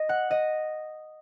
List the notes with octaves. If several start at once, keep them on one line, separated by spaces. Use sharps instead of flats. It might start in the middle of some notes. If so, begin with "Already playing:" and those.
Already playing: D#5
F#5
D#5